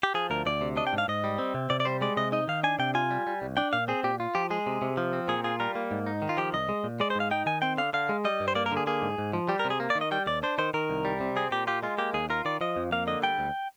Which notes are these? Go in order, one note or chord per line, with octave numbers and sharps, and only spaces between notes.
G4
F3 G#4
D2 A#4
D2 D5
C3
D4 D#5
G5
G#2
F5
G#2 D#5
G3
C4
C3
C3 D5
D5
G3 C5
G#3 D5
C3 D#5
D#4 D#5
D#3 F5
D4 G#5
C3 G5
F4 G#5
G3
G3
C2
D4 G5
A#2 F5
C4 G#4
A#2 G4
F4
F3 G4
G#3 G#4
C3
C3
F3
C4
A#2 G#4
F4 G#4
G3 A#4
A#3
G#2
D#4
D#3
F4
F3 G4
C2 D#5
G#3
A#2
G#3 D5
C5
G#2 F5
D#4 G5
D#3 G#5
C4 G5
D3 F5
D3 F5
G#3
G3 D#5
G2
C5
A#3 D5
A#4
D3 G#4
A#3 G#4
G#2
G#2
F3
G3 G4
A#4
C3
G#4
A#3
D5
D#3
D#5
G3 G5
D#2 D5
D4 C5
D#3 C5
D#3 A#4
C2
G3
C3
C4 G#4
A#2 G4
F4 G4
G#3 F4
A#3 G4
D#2 G#4
F4 A#4
D#3 D5
F3 D#5
F2
A#3 F5
D3 D#5
G3 G5
D2